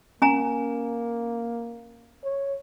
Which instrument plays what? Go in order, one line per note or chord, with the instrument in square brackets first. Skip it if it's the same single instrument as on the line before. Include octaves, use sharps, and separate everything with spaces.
[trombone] A#3 [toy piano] C#4 G#5 A#5
[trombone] C#5